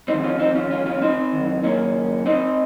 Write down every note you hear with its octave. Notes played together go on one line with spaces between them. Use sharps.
F2 D#3 C4 D#4
C#4 F4
C4 D#4
C#4 F4
C#4 F4
C#4 F4
C4 D#4
F#2 D#3
A#3 C#4
C4 D#4